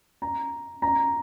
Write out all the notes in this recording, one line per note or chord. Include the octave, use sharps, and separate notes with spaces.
A#5
A#5